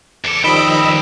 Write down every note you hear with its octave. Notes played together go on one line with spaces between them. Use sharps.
E2 A4 D6
C#2 D#3 F3 G3 D#5 G5 B5 E6